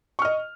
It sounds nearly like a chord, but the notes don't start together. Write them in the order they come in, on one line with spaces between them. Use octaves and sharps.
C#6 F6 D#5